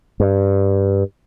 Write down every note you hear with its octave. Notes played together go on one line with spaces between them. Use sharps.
G2